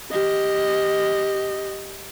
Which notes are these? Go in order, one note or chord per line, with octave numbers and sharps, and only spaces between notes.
G4 D#5